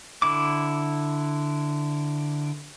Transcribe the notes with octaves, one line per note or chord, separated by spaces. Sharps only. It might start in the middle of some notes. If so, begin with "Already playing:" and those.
D3 E4 D6